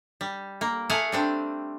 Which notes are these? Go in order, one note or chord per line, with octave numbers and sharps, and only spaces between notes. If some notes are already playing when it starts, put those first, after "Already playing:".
G3
A#3
A3 G#4 F5 F#5
G3 C4 D4